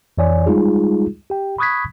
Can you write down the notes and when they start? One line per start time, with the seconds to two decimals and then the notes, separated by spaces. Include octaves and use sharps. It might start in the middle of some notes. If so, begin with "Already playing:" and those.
0.18 F2 E3 C#5 D5 G#5
0.46 G3 G#3 D#4 F4 G#4
1.30 G4 G5
1.58 B5 C#6 D#6 F#6 G#6 B6